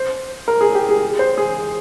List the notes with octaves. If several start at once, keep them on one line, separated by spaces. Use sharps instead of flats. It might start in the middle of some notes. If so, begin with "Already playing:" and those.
Already playing: C5
A#4
G#4
G4
G#4
C5
G#4